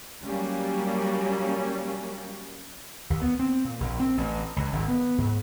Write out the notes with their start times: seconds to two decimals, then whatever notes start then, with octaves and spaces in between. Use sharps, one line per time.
0.24 F#3 G3 A#3 C#4
3.10 D#2
3.21 B3
3.39 C4
3.65 A#2
3.80 A#1
4.00 C4
4.17 A1
4.56 C#2
4.73 G#1
4.88 B3
5.18 G#2